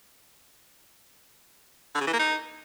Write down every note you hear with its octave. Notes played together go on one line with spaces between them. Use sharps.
D3
C#3
E3
A#3
D#4